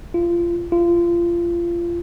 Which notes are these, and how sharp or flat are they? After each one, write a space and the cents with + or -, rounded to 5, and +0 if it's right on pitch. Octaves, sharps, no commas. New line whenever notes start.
F4 -25
F4 -25